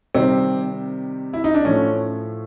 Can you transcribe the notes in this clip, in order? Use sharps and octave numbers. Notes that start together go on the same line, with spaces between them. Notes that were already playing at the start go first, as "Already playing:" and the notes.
C3 D#3 G3 C4
E4
D#4
D4
A2 F3 A3 C#4